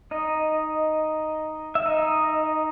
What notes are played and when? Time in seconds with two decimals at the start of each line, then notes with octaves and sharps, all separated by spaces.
0.11 D#4 D#5
1.75 E5
1.86 D#4 D#5